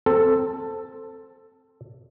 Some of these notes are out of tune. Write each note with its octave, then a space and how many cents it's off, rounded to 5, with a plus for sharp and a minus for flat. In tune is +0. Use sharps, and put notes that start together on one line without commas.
C4 +0 A4 +5